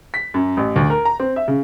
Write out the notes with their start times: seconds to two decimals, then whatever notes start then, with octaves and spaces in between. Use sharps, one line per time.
0.14 B6
0.34 F#2
0.57 A1
0.76 D2
0.90 A#4
1.05 A#5
1.20 C4
1.36 E5
1.48 C#3